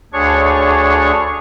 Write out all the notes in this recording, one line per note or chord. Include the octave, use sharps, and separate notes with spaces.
D2 D4 G#4 C#5 C#6